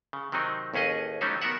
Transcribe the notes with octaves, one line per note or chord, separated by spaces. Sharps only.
C#3
C3 D#3 F#3 C4 D#4
A1 D#2 C#4 G#4 D#5
F#3 G3 A3 C#4 D#4 C5
D#3 B3 F#4 A#4 E5 F#5